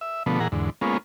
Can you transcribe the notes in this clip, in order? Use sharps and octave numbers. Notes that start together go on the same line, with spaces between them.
E5
B2 D3 F3 A3 B3
A#2 E3 G#4 F#5 A#5
E2 G#2 D3
G#3 A#3 B3 C#4 F4